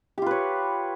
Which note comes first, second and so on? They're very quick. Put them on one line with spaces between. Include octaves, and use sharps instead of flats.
G4 F4 B4 C#5